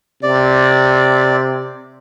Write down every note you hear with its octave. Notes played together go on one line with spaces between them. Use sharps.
C3 D5